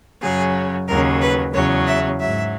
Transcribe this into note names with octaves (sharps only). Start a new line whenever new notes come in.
F#2 C#3 F#3 G#4
D#2 C#3 F#3 A#4
B4
E2 C#3 F#3 C#5
E5
G#2 F#3 E5